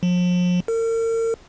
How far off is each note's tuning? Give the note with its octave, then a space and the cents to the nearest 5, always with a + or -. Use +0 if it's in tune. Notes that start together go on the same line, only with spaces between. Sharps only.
F3 +40
A#4 -40